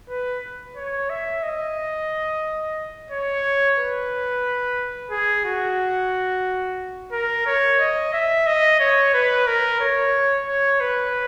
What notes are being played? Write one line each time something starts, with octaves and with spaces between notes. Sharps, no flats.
B4
C#5
E5
D#5
C#5
B4
G#4
F#4
A#4
C#5
D#5
E5
D#5
C#5
B4
A#4
C#5
C#5
B4